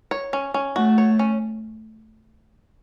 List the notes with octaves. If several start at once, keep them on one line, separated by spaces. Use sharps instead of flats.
C#5
C#4
C#4
A3 F#4
C#5
C#4